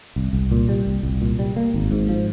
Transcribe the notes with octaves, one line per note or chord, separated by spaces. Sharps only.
C2
C2
A#2
G3
C2
C2
A#2
G3
A#3
G#1
G#2
F3